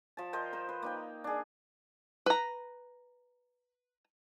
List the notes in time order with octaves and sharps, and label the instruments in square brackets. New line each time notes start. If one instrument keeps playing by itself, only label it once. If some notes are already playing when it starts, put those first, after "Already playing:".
[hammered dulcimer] F3 A5
A#4 C5 D#5 G5
A#4 C5
B4
A#3 D#4 G5
D4 G#4
[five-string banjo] B4 A#5